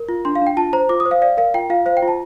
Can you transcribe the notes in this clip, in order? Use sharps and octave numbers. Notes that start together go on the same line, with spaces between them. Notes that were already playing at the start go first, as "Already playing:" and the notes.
Already playing: A#4
F4
D4 C6
F5
D4
G5
F4 A5
C5 A#5
F4 D6
D#6
C5
F5
D5 F5
A#4 F5
F4 G5
F4 F5
C5 F5
G5
F4
A5